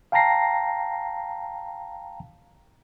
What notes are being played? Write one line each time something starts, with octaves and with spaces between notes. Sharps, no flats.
F5 G5 A5 A#5 A#6 C7